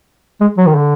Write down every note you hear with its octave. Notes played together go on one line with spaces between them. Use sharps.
G#3
F#3
D#3
D3